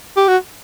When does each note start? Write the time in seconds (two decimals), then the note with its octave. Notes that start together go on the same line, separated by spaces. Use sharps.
0.17 G4
0.28 F#4